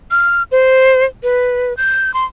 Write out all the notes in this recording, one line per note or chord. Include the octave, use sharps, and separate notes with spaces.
F6
C5
B4
G6
C6